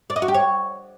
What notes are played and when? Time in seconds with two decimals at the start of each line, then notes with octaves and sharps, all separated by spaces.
0.10 D5
0.16 D#5
0.22 F#4
0.28 G4
0.34 C#5